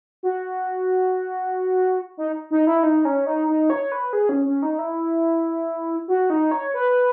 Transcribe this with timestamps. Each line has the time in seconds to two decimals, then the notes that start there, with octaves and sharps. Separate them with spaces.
0.23 F#4
2.17 D#4
2.51 D#4
2.67 E4
2.83 D#4
3.05 C#4
3.26 D#4
3.48 D#4
3.70 C#5
3.92 B4
4.13 G#4
4.29 C#4
4.45 C#4
4.62 D#4
4.79 E4
6.08 F#4
6.30 D#4
6.51 C#5
6.74 B4